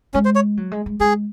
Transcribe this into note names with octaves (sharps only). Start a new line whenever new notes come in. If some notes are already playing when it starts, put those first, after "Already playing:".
G#3 C#4
C5
C#5
F#3
G#3
G#3
G#3 G#4